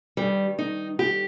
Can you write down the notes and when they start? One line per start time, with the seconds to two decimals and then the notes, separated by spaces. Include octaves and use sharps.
0.17 G2 D#3 G3
0.59 D#4
0.99 G4